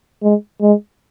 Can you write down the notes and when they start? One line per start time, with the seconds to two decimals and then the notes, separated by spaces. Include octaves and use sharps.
0.23 G#3
0.62 G#3